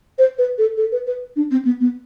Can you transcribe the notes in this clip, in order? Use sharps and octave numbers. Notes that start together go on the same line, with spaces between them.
C5
B4
A4
A4
B4
B4
D4
C4
B3
B3